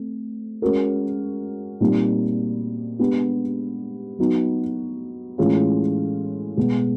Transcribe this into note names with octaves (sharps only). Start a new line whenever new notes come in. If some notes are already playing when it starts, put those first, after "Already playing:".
Already playing: A3 C4
G#3 C#4 F#4 A#4
A#2 G3 C4 D#4
G#3 B3 D4 G4
F#3 B3 D#4 F#4
A2 E3 G#3 C#4 F4
B2 G#3 B3